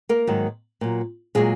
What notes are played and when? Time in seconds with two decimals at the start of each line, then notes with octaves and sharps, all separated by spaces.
0.09 A#3 A#4
0.27 G#2 D#3 F#3
0.81 A#2 F#3
1.35 A#2 F#3 G#3 G#4